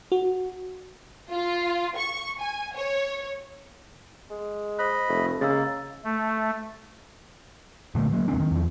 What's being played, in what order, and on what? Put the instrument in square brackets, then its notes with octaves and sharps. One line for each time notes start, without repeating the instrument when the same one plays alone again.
[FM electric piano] F#4
[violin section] F4
C#6
G#5
C#5
[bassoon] G#3
[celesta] C5 F#6 [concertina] D#5 B5
[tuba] F1 [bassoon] A3
[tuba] C#3 [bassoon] G#3 [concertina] A#3 [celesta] A#5 E6 A6
[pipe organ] A3
[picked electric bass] A#2 D3 A3
F#3 A#3
E1 C#2 C4 D4
D#3
E2 F3